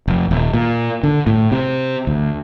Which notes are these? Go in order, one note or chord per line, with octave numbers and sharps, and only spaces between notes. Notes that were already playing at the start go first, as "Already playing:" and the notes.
F1
D#1
A#2
D3
A2
C3
D2